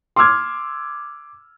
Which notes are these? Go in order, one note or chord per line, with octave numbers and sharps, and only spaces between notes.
C6 D6 E6 F6 G#6